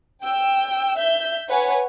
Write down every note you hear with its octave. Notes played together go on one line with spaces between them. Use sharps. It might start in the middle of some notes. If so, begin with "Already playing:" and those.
G5 E6
E5 G6
B4 C#5 F#5 G#5